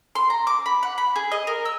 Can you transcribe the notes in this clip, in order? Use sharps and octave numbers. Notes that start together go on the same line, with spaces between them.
C6
A#5
D6
B5
F#5
B5
G#4
D#5
A#4
E6